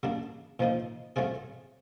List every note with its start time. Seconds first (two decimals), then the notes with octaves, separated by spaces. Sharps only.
0.03 C#3 F#3 A#3 D4
0.59 A#2 F3 A#3 D#4
1.16 F#3 A3 C4 F4 G#4